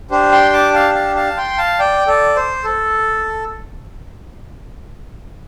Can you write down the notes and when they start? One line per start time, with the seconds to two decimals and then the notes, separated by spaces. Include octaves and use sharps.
0.11 D4 G4 C5
0.32 G5 C6
0.53 A5 D6
0.74 F5 A5
0.95 F5 A5
1.16 F5 A5
1.37 G5 C6
1.58 F5 A5
1.79 D5 G5
2.07 A4 D5
2.36 C5
2.64 A4